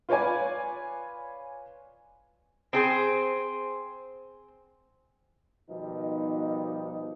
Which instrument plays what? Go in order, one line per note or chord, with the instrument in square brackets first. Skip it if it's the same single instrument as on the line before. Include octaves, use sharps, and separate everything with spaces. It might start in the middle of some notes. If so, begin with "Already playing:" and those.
[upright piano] F4 B4 C#5 D5 G#5
[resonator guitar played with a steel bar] C4 G#4 C5
[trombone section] B2 D#3 F3 G3 B3 D#4